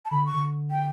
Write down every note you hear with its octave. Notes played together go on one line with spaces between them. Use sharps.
A5
D3 B5
C#6
D3
G5